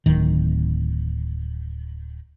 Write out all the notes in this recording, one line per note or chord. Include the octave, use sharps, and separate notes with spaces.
D1 D#3